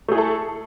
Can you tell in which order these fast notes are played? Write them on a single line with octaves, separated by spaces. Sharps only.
A3 G#4 E4 A4